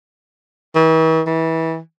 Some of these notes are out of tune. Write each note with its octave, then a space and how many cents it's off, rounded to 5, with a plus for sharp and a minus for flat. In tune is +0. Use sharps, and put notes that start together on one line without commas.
E3 -45
E3 -25